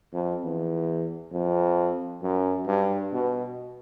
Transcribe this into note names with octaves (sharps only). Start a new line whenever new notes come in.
F2
E2
F2
F#2
G2
B2